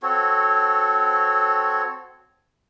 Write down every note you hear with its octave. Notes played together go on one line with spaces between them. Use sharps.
C4 F#4 A4 C#5